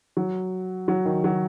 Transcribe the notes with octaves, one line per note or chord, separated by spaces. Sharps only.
F#3
F#3
D#3
F#3